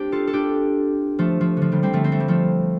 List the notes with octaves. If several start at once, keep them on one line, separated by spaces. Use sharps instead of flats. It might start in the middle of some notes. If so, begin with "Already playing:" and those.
Already playing: A3 C4 D4 G4
F4 A4
A4
D4 G4
F3 A3
F3
D3 F3
D3 G3
G3 C4
F3 A3
C4
A3
G3
F3 A3